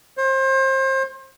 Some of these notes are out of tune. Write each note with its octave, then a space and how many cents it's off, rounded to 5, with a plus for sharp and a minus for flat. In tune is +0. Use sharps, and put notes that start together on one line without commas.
C5 +30